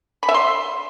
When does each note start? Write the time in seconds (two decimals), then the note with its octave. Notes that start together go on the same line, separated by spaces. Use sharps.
0.23 B5
0.29 E5
0.34 C6